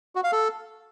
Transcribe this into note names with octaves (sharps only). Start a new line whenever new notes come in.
F#4
F5
A4